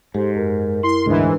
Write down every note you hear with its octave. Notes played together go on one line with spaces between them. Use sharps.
G#2 G4 A4 C5
F#2 A#4
E4 C6
D2 G#2 E3 D4